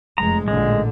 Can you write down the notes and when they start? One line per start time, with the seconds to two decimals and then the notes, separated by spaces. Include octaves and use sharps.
0.18 F1 G#3 A#5
0.48 A1 A#2 D3 G#3